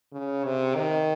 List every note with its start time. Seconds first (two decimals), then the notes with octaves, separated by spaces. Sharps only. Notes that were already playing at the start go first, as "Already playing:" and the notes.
0.12 C#3
0.44 C3
0.76 D#3